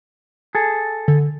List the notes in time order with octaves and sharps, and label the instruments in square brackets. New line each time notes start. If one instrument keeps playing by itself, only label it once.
[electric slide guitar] G#4 A4
[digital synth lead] D3